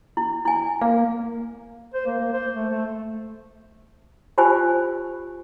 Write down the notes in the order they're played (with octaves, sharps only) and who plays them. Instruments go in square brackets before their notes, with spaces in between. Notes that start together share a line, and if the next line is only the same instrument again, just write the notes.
[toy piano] E4
E4 G#5
[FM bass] A#3 [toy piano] F5
[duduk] C5
A#3
A#3
C5
A3
A3
[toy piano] F4 G4 C5 G#5